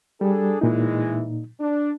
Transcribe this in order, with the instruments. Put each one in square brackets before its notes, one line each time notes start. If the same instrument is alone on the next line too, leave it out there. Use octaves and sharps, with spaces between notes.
[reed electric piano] G3 [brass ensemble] D4 G#4 A4
[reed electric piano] A#2 D#4 [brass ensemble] E3 G#3 E4
[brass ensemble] D4